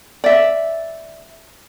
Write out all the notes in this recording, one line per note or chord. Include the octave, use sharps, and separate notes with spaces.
D5 E5